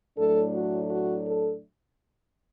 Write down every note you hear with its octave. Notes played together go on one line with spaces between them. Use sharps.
A2 F#3 A3 D4 A4
F#4
F#4
A4